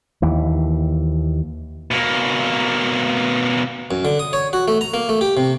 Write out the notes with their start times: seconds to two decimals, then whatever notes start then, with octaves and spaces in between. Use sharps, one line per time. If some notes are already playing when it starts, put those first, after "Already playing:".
0.22 D#2 E3
1.91 B2 A#3
3.91 F#2
4.05 D3
4.19 D#6
4.33 C#5
4.53 F#4
4.68 A3
4.81 A#5
4.94 A#3
5.09 A3
5.21 G4
5.37 C3